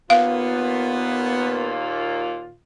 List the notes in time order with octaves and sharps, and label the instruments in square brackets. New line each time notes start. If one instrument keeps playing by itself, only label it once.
[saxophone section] D#2 A#2 F4 [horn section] B3 [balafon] F5